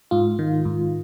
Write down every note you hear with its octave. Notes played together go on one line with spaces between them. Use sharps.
G#2 F4
D#3
G#2